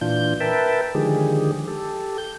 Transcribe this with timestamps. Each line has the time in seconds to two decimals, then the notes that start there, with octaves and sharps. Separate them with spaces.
0.01 A#2 E3 D4 F4 G6
0.40 A#4 B4 E5 G5 A5
0.95 D3 D#3 F3 G#3 G4 G#4
1.68 G4 A4
2.18 G6